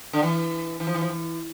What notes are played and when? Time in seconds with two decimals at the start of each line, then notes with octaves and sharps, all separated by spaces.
0.13 D3
0.23 E3
0.80 E3
0.87 F3
0.95 E3
1.01 F3
1.09 E3